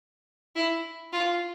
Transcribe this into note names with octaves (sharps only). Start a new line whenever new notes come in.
E4
F4